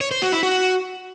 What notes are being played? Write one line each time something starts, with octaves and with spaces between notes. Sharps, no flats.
C#5
C5
F#4
E4
F#4